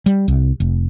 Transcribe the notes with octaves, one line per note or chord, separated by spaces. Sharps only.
G3
C2
F1